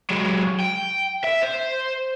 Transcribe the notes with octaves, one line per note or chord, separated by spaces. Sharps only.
F#3 G#3
G5
E5
C5